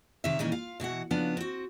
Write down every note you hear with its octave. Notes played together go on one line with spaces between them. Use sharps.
C3 D#3 C#5 E5
A#2 D#3 E3 C#4 D#4
F4 F5
B2 E3 F#4 F#5
C#3 F3 B3 D4
C4 F#4